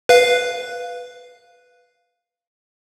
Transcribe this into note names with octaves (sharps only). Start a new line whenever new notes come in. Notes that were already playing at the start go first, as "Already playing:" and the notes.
B4 F5